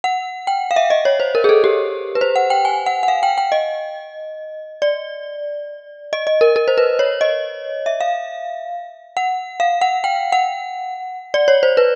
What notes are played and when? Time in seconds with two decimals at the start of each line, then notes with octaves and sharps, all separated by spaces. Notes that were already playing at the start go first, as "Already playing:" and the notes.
0.04 F#5
0.47 G5
0.71 F5
0.76 E5
0.90 D#5
1.05 C#5
1.20 C5
1.35 A#4
1.44 G#4
1.49 A4
1.64 G4
2.15 B4
2.21 C5
2.36 F#5
2.50 G5
2.65 G#5
2.86 F#5
3.03 F#5
3.08 F5
3.23 G5
3.38 G5
3.52 D#5
4.82 D5
6.13 D#5
6.27 D#5
6.41 A#4
6.56 A#4
6.68 C5
6.78 B4
6.99 C#5
7.21 D#5
7.86 E5
8.01 F5
9.17 F#5
9.60 F5
9.81 F#5
10.04 G5
10.32 F#5
11.34 D5
11.48 C#5
11.63 C5
11.77 B4